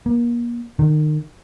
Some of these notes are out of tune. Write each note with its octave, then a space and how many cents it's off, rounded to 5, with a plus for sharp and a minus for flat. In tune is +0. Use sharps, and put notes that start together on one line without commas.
A#3 +35
D#3 -30